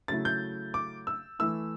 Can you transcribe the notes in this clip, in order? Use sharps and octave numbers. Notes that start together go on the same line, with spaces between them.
C#3 F#3 A3 E4 A6
G6
D6
E6
E3 A3 E4 E6